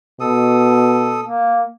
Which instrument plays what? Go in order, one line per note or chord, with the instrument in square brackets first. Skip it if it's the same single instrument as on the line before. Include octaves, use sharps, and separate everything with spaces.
[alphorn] B2 [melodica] A4 D#6
[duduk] A#3